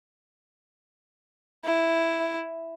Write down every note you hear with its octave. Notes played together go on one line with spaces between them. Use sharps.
E4